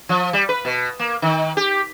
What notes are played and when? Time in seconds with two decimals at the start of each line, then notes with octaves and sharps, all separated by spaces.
0.09 F3
0.33 G3
0.49 B4
0.65 B2
0.99 A#3
1.22 D#3
1.57 G4